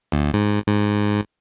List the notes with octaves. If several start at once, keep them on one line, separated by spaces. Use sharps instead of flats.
D2
G#2
G#2